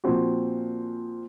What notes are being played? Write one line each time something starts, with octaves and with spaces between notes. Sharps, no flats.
A#2 F3 C4 F#4